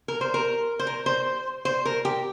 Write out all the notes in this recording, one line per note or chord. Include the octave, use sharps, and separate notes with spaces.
A#4
C5
A#4
C5
A#4
C5
C5
A#4
G4